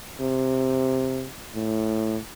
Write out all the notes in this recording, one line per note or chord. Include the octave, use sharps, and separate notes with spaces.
C3
A2